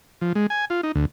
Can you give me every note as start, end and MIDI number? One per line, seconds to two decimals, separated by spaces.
0.21 0.33 53
0.35 0.47 56
0.50 0.65 80
0.70 0.81 65
0.83 0.92 63
0.95 1.05 38